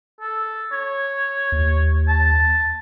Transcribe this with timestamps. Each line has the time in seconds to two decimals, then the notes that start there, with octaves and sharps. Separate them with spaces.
0.21 A4
0.72 C#5
1.52 D#2
2.08 A5